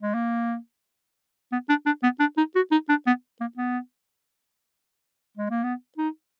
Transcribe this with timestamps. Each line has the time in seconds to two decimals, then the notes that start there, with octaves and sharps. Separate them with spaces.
0.02 G#3
0.14 A#3
1.52 B3
1.69 D4
1.86 D4
2.03 B3
2.20 D4
2.37 D#4
2.55 F#4
2.72 D#4
2.89 D4
3.07 B3
3.41 A#3
3.58 B3
5.37 G#3
5.50 A#3
5.64 B3
5.98 D#4